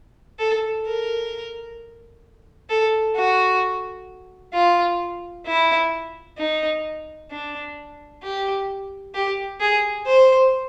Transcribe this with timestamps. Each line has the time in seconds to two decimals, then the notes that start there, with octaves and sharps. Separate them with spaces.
0.39 A4
0.86 A#4
2.70 A4
3.16 F#4
4.54 F4
5.46 E4
6.38 D#4
7.30 D4
8.23 G4
9.15 G4
9.60 G#4
10.06 C5